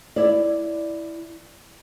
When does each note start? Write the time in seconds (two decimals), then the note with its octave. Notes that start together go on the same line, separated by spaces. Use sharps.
0.16 E4 D5